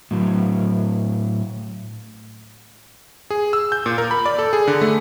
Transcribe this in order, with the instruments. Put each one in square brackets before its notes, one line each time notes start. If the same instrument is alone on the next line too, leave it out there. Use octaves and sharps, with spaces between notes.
[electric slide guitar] A2 F#3
[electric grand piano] G#4
E6
G6
A#2
A#4
B5
D5
A4
G#4
D3
A3